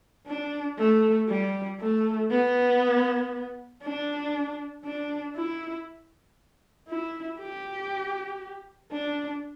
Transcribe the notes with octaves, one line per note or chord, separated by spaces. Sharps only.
D4
A3
G3
A3
B3
D4
D4
E4
E4
G4
D4